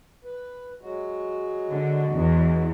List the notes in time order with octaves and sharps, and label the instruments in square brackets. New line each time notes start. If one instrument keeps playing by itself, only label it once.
[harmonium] B4
F#3 G#3 F#4
[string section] D3
E2